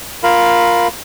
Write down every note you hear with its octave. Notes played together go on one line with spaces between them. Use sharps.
F4 A#4 F5 B5